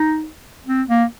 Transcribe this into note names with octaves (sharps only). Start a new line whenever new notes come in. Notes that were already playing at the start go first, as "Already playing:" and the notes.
Already playing: D#4
C4
A#3